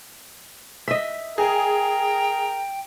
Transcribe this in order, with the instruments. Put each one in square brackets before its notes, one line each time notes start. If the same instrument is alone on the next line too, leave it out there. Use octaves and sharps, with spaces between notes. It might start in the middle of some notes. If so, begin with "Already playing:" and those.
[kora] D#5 E5 [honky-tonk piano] B6
[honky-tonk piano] G#4 [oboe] A#4 [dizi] G5